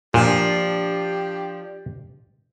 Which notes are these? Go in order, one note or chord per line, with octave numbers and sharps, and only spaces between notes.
A#2 F3 D4 G4